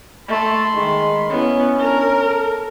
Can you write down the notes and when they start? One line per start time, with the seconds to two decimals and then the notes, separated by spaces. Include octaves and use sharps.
0.28 A3 B5 C6
0.75 D#3 G#3
1.30 B3 C#4 E4
1.79 D4 A#4
2.23 A4